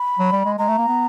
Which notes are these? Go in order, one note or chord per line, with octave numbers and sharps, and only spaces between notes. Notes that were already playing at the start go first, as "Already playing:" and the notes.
Already playing: B5
F#3
G3
G#3
G#3 A#5
A3
A#3
B3